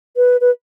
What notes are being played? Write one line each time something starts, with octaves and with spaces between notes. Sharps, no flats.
B4
B4